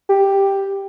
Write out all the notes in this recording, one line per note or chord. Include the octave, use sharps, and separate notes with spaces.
G4